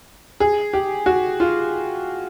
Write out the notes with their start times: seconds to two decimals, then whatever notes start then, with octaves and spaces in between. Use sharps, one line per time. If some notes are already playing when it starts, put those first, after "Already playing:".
0.40 G#4
0.73 G4
1.06 F#4
1.40 F4